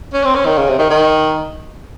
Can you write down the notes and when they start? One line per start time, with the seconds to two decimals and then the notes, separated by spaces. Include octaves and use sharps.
0.14 C#4
0.24 C4
0.35 C#4
0.46 D#3
0.58 C#3
0.68 C3
0.79 D#3
0.90 D#3